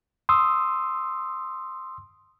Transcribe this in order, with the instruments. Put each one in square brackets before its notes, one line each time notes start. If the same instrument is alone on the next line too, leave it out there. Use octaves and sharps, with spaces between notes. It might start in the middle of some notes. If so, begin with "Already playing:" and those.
[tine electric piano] C6 D#6 E6